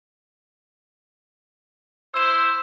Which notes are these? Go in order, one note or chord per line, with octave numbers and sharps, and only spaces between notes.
E4 C5 E6 E7